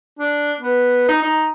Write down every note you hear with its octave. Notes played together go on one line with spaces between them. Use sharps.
D4
B3
D#4
D#4